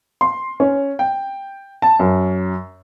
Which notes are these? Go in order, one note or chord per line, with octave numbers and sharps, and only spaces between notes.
C6
C#4
G5
A5
F#2